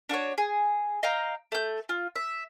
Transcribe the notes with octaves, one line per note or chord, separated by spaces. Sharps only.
D4 F#4 A#4 C#5
G#4
D#5 F5 G5 A#5
A3 G6
F4
E5